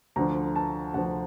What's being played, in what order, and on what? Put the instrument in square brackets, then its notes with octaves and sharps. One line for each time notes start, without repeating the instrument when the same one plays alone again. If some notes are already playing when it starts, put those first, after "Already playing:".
[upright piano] D2 D3 F3 A#5
A5
D2 D3 F3 F#5